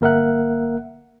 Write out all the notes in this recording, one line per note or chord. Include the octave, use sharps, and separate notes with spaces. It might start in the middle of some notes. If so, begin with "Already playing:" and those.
G1 A#3 A#4 E5 F#5 F#6